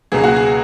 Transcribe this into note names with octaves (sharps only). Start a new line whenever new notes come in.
C#2 B2 F#3 A#3 G#4
F#4
G#4